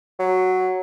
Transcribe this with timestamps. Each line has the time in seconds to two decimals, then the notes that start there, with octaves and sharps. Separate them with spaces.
0.20 F#3